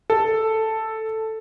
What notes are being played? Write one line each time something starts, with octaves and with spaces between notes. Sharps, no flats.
A4